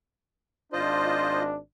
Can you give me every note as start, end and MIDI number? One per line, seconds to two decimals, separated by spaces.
0.73 1.58 32
0.73 1.58 62
0.73 1.43 65
0.73 1.43 72
0.73 1.43 75